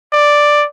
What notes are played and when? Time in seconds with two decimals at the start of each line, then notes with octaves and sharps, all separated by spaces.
0.13 D5